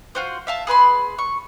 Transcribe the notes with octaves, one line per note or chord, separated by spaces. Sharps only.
F4 F#4 C5
E5 F5 A5
G#4 B4 B5 C6
C#6